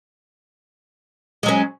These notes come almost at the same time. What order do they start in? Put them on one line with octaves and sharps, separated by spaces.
G#3 F#3 C#4